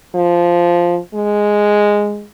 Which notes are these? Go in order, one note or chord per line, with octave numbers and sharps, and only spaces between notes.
F3
G#3